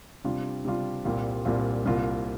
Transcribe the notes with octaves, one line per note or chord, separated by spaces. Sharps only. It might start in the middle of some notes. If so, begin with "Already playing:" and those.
C3 G3 D4 F4
C3 G3 D4 F4
C2 A#2 G3 C4 F4
C2 A#2 G3 C4 F4
C2 C3 A#3 F4